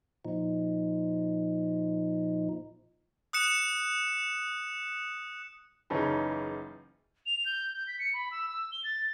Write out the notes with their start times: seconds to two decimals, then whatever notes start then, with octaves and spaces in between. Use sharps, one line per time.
0.25 A#2 F3 D#4
3.33 D#6 F#6 C#7 E7
5.90 F#1 C#3 E3 C#4 D#4 A5
7.26 F7
7.46 G6
7.74 G6
7.88 B6
7.99 C#7
8.13 B5
8.31 E6
8.49 E6
8.72 G7
8.84 A6